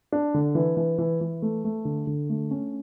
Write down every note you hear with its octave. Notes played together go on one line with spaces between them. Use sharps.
D4
D3
E3
E3
E3
E3
A3
A3
D3
D3
A3
C#4